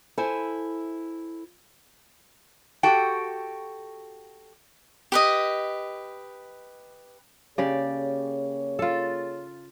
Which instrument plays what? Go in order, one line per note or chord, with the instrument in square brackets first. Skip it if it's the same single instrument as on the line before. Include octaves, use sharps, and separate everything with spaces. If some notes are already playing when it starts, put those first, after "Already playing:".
[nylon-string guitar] E4 A4 C5 G#5
[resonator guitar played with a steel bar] F#4 G4 A4 G5
[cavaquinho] G4 B4 D#5
[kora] C#3 G4 D5 [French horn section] A#3 G#4 C#5
[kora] F4 A4